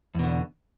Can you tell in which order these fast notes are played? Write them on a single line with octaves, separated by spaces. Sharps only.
E2 B2 D3